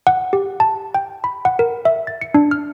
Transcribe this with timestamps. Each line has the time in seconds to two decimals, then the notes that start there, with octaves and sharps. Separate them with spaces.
0.07 F#5
0.33 G4
0.60 A5
0.95 G5
1.24 B5
1.45 F#5
1.59 A#4
1.85 E5
2.07 A6
2.21 C#7
2.34 D4
2.51 F6